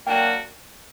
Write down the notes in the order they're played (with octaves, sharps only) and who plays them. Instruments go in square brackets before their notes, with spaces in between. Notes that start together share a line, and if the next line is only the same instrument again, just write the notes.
[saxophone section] F#3 A#3 D4 F#4 A#4 [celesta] G5